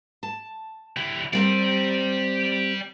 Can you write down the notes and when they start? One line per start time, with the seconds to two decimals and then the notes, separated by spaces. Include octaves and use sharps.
0.23 A5
0.97 D3 E4 G4
1.33 G3 C4 G4 A#4 D5